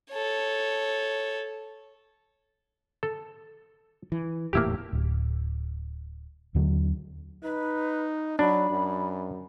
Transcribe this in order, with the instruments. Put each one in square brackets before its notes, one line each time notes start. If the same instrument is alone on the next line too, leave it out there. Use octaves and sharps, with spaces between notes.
[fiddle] A4 C#5
[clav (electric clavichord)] A4
[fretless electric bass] E3
[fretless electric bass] D#1 E2 A2 [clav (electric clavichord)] A#3 E4 G4
[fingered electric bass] D1
D#2 D3 F#3
[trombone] D#4 [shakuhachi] B4
[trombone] F#3 [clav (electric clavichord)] D4 [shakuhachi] B5
[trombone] F#2